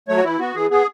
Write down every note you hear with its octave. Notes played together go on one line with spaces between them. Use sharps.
F#3 A3 C#5
F#4
E3 E4
B3 F#4
E3 G#4
B3 G#4